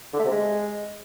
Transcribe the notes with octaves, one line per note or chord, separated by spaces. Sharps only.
D3
A3
C3
G#3